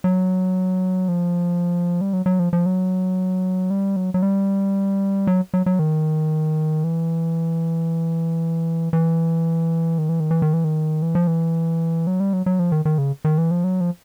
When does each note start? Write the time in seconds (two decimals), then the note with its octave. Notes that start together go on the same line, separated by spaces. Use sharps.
0.04 F#3
1.08 F3
2.01 G3
2.13 F#3
2.26 F#3
2.39 F3
2.53 F3
2.66 F#3
3.70 G3
3.96 F#3
4.14 F#3
4.23 G3
5.27 F#3
5.54 F#3
5.66 F#3
5.79 D#3
6.84 E3
8.93 E3
9.98 D#3
10.09 E3
10.20 D#3
10.31 E3
10.42 D#3
10.53 E3
10.64 D#3
11.02 E3
11.15 F3
11.27 E3
12.07 F#3
12.20 G3
12.33 F#3
12.46 F#3
12.59 F3
12.72 D#3
12.85 D#3
12.98 C#3
13.25 D#3
13.38 E3
13.51 F3
13.64 F#3
13.81 F3